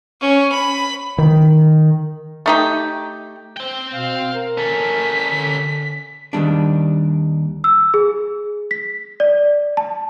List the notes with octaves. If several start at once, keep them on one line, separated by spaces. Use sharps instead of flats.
C#4
B5
D#3
A3 D#4 G4
C4 G5 G7
B2 F5
A#4
C#4 A4 B6
D3
D#2 D#3 G3 D4
E6
G#4
B6
D5
A5